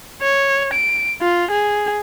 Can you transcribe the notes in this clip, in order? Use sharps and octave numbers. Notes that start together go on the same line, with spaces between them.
C#5
D7
F4
G#4